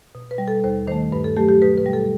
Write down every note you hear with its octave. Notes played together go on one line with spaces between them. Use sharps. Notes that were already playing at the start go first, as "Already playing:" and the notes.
B2
B4
G3
A4
D#2 C5
D#3 A3 C5
G2 B4
A4
F#3 A3 G4
G4
B2 B4
B4
G3
A4